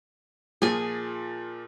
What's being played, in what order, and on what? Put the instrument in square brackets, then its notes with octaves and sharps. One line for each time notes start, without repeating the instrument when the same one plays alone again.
[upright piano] A#2 F3 [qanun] G#4 G#5